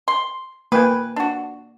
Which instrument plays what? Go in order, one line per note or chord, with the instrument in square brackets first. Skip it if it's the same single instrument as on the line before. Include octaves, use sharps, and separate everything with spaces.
[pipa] C6
[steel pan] A#3 G5 G#5 [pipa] B4
[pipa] D4 F#4